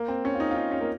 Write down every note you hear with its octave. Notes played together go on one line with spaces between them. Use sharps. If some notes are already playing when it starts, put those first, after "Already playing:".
Already playing: A#3
C4
C#4
F4
D#4
F4
D#4
C#4
A#3